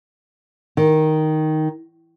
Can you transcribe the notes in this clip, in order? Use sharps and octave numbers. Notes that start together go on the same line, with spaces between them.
D#3